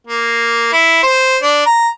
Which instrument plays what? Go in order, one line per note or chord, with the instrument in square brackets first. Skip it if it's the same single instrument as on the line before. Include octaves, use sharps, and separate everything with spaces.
[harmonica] A#3
E4
C5
D4
A#5